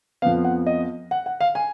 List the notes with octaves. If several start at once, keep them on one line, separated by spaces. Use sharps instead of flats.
F2 F3 B3 F5
F#5
D#5
F#5
F#5
F5
G#5